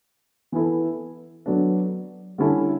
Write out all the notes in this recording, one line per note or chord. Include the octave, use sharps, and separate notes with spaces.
E3 B3 E4 A4
F#3 B3 D4 A4
D3 G3 C#4 E4 A4